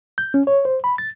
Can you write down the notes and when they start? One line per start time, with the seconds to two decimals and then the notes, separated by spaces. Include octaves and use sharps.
0.18 G6
0.34 C#4
0.47 C#5
0.65 C5
0.84 B5
0.98 A6